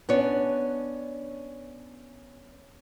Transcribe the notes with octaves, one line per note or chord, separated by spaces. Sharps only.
B3 C#4 D4 C#5